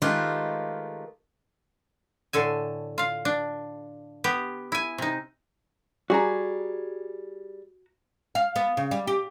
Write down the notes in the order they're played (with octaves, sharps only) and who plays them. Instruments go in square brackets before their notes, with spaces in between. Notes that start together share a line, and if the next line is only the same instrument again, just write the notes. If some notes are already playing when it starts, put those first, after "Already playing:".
[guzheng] D#3 G#3 A3 F4 G4 B4
[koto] A2 D3 A4 G#5
F4 F5
D4
B3 G4
E4 G#5
C3 D#4
[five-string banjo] G3 G#4 [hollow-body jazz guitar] F#4 A#5
[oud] F5
B3
C#3
G3
G4